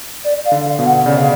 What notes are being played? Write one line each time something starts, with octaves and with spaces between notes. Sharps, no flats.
D5
F5
D3
F5
B2
F#5
C#3 D5
F5